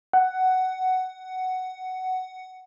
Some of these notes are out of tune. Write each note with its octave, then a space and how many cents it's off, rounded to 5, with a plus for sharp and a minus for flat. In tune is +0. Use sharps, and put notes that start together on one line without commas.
F#5 +10